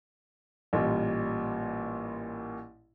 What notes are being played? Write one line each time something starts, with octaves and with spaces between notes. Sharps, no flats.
A1 A#2 G3